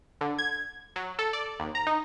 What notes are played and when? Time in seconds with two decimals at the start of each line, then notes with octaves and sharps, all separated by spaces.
0.21 D3
0.39 G#6
0.96 F#3
1.19 A4
1.33 D5
1.60 D#2
1.75 A#5
1.87 D#4